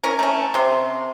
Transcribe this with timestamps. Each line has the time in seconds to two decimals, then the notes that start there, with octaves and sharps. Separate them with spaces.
0.03 C#4 E4 A#4
0.19 A3 C#4
0.54 C3 C6